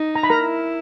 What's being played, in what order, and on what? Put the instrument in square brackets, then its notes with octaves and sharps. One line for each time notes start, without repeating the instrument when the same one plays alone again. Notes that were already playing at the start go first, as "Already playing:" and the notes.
Already playing: [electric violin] D#4
[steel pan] A#5
B5
A#4 A#5
[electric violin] E4